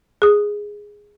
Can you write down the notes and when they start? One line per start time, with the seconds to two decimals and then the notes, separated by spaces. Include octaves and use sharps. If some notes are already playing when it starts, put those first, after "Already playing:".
0.22 G#4 D#6